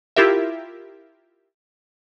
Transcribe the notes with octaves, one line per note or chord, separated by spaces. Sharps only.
E4 F4 G4 A#4 E5